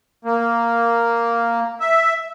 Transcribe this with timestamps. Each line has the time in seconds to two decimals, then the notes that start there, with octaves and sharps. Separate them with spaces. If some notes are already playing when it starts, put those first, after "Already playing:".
0.25 A#3
1.80 E5